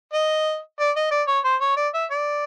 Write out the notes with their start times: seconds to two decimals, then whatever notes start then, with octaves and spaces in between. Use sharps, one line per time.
0.13 D#5
0.80 D5
0.96 D#5
1.11 D5
1.28 C#5
1.44 C5
1.61 C#5
1.77 D5
1.94 E5
2.10 D5